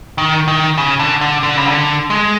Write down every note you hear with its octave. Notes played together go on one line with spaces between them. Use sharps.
D#3
D#3
C#3
D3
D3
D3
C#3
D3
G#3